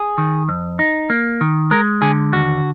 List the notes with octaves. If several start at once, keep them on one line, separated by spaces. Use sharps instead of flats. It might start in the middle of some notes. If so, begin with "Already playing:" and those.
Already playing: G#4
D#3
F2
D#4
A#3
D#3
G#3 A#4
D3 G#4
D#2 F#4